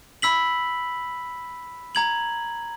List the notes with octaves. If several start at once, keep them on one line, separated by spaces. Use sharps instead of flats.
B5 E6 B6 F#7
A#5 G#6 F#7